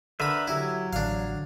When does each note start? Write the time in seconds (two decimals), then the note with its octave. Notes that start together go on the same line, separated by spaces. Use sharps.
0.20 D3 A#4 B4 E5 B5
0.48 F#3 E4 G4 E5
0.93 A1 D3 D4 F5